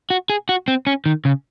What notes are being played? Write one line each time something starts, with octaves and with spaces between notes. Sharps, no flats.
F#4
G#4
F#4
C4
C#4
D#3
C#3